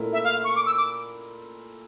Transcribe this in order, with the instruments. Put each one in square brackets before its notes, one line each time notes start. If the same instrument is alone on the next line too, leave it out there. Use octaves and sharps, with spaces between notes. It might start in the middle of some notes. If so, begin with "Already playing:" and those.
Already playing: [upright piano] A#2 A3 E4 A#4
[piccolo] E5
F5
C#6
D6
E6
D6